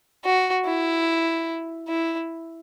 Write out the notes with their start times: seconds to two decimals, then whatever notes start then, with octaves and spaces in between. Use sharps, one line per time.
0.24 F#4
0.66 E4
1.88 E4